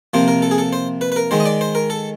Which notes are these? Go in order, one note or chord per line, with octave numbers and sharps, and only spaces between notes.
C3 F3 A#3 C5
A#4
A4
G#4
A4
C5
B4
B4
A#4
D#3 G#3 C5
D#5
D5
C5
A#4
A4